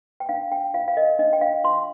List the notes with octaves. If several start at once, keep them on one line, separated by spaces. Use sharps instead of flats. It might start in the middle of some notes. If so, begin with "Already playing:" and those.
G5
D4 F5
D4 G5
F4 F5
F5
A#4 D#5
D4 D#5
G5
D4 F5
F4 C6